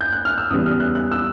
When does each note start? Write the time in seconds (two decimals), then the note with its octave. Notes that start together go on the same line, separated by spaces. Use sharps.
0.01 G6
0.13 F#6
0.25 F6
0.38 E6
0.50 E2 C#3 E3 G3 D#6
0.66 F6
0.80 F#6
0.95 F#6
1.12 E6